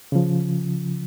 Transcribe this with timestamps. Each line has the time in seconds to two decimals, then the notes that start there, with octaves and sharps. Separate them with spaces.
0.12 C#3 F3